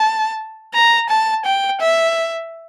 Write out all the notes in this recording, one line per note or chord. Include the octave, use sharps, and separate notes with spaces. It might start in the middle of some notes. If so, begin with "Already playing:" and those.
Already playing: A5
A#5
A5
G5
E5